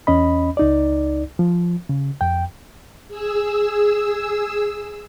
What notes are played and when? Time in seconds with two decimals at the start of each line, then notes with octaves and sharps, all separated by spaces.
0.07 E2 C#4 D#5 B5
0.57 C#2 D#4 D5
1.39 F3
1.89 C#3
2.21 F2 G5
3.08 G#4 E6